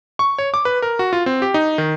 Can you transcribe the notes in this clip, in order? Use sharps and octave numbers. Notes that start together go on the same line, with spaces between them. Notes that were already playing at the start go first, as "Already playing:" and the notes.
C#6
C#5
D6
B4
A#4
F#4
F4
C4
G4
D#4
D#3